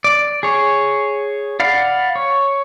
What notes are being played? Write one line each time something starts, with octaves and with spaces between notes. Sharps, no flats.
D5
G#4 C#5
D5 F5 F#5 B5
C#5